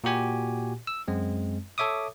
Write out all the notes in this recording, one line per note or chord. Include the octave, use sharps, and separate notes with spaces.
A#2 F#4 G4 G#5
E6
F#2 G#3 C4
A4 C#5 E5 D6 D#6